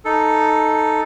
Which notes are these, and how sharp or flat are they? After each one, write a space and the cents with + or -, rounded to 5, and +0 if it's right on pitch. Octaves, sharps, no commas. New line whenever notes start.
D#4 +0 A4 +0